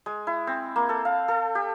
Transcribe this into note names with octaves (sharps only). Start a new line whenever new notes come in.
G#3
E4
C4
A#3
A4
F5
A4
G4